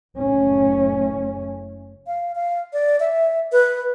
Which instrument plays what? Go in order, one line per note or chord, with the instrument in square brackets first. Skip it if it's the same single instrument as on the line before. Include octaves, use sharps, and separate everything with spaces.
[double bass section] F#1 A3 C#4
[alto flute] F5
F5
D5
E5
B4